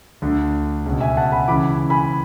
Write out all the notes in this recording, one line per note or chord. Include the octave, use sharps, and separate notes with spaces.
D2 D3
C#2 B2
E5 G#5
F#5 A5
G#5 B5
C#2 C#3 E3 B5 D6
G#5 B5